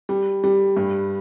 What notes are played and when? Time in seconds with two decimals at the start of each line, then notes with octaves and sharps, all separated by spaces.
0.09 G3
0.44 G3
0.77 G2